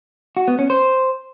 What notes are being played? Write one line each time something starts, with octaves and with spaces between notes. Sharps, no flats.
F#4
B3
C#4
C5